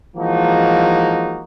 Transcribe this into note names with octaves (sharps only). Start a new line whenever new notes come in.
E3 F3 G#3 A#3 D#4 F#4